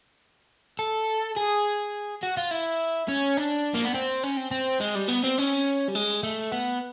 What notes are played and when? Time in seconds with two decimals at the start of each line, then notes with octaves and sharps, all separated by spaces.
0.79 A4
1.36 G#4
2.23 F#4
2.37 F4
2.51 E4
3.08 C#4
3.37 D4
3.74 A#3
3.85 B3
3.94 C4
4.23 C#4
4.37 C4
4.51 C4
4.80 G#3
4.95 G3
5.09 B3
5.24 C4
5.38 C#4
5.88 G3
5.95 G#3
6.23 A3
6.52 B3